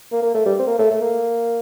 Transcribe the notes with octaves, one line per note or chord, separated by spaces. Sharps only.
A#3
A#3
A3
G3
C4
A#3
A3
A3
A#3